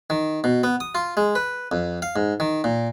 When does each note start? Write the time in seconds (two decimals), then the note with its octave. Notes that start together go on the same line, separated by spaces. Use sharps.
0.10 D#3
0.44 B2
0.63 B3
0.80 D#6
0.95 F4
1.17 G#3
1.35 B4
1.72 F2
2.02 F5
2.16 G#2
2.40 D#3
2.64 A#2